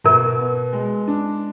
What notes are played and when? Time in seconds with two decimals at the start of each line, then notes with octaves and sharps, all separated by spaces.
0.04 B2 A#4
0.39 B3
0.73 G#3
1.08 D4